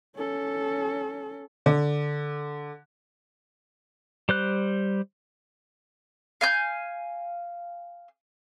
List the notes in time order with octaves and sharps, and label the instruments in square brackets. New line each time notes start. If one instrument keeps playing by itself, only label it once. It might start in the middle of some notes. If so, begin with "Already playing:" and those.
[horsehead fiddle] C#4 A4
[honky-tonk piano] D3
[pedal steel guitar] G3 C5 F#6
[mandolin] F5 G#5 G6